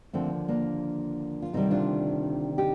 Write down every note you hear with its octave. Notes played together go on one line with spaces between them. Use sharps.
D#2 D3 F3 A3 C4
A#3 D4
F4
D2 C3 D#3 G3 C4 D#4
D4 F4
D#4 G4